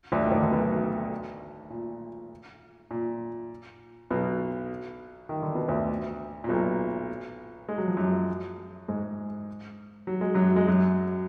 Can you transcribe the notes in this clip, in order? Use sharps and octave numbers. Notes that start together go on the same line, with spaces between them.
D2 D3
D#3
D2 D3
D3
B1 B2
A#2
A#2
B1 B2
D#3
D3
B2
D2 D3
A#2
B1 B2
G#3
F#3
F3
F#2 F#3
G#2 G#3
F#3
G#3
F#2 F#3
G#3
F#2 F#3